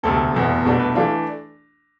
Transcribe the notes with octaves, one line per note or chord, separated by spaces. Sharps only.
E1 D2 C3 A4
F1 E2 B2 A3
C2 B2 A3 D4 A4
B4
E3 A3 D4 F4